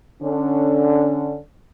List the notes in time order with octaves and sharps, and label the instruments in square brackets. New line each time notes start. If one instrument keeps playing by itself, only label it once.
[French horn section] D3 C#4